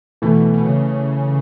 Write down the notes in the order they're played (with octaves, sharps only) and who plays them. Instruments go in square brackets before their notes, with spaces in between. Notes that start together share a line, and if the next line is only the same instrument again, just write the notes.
[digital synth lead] B2 [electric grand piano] E3 A3
[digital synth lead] B2
C#3